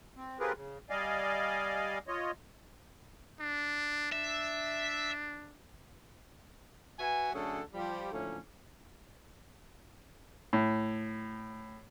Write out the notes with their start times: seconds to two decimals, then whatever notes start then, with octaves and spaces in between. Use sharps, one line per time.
0.16 C4
0.40 C4 F4 G4 G#4 A#4 B4
0.54 C#3
0.90 G3 D5 D#5 F5 G#5
2.08 F4 C#5 D#5
3.40 D4
4.12 D4 E5
6.99 F#4 B4 E5 G#5
7.34 D3 F#3 A3 C#4 G#4 A4
7.74 F3 G3 G4
8.11 A2 D3 F3 A3 A#3 C#4
10.53 A2